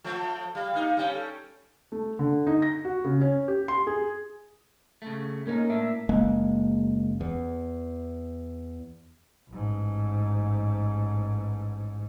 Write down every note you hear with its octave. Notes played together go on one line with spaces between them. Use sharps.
F3 A3
G3 F5
A#3 D#4
G3 C#4
A4
A3
D3
D#4
A#6
F#4
C#3
C#4
G4
C6
G#4
C#3 A3
A#3 C#4 D#4 A#4
A2 D4 E5
F#1 G#3 A#3
E2
A1 G#2